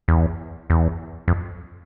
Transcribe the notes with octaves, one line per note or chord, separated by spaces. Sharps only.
E2
E2
F2